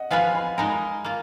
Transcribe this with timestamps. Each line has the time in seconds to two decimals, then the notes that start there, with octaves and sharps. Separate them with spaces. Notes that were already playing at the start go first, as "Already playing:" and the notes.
Already playing: D#5 F#5
0.11 F3 B3 F4 B4 F5 G#5
0.35 G#5 B5
0.57 G#3 D#4 A#4 G#5 B5
1.05 A#3 F4